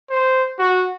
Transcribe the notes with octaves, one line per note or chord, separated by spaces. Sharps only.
C5
F#4